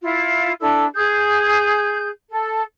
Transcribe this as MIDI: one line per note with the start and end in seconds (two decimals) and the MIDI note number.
0.02 0.51 64
0.02 0.51 65
0.60 0.84 62
0.60 0.84 64
0.60 0.84 69
0.60 0.84 88
0.95 2.08 68
0.95 2.08 91
2.30 2.61 69